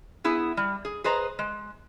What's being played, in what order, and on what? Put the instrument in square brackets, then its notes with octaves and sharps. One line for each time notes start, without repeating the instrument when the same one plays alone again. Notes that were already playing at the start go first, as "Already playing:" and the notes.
[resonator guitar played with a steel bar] B3 E4 G#4 F#5
G3
G#4
G#4 B4 C5 D#5 A#5
G#3